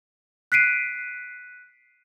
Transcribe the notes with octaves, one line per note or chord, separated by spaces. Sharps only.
F#6 B6 C7 D7 D#7